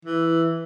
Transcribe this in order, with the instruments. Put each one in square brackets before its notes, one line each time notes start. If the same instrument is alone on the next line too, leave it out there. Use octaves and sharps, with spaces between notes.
[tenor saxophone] E3